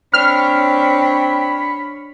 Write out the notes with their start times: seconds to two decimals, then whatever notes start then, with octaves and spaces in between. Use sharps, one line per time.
0.14 C4 D4 C#5 B5 F6